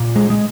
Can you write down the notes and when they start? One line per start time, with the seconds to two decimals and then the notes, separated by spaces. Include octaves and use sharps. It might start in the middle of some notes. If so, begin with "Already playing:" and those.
Already playing: A#2
0.16 G#3
0.30 G#3